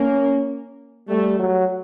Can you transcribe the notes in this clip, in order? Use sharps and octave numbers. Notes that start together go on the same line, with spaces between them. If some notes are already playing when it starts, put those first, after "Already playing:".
Already playing: A#3 C#4
G3 A3
F#3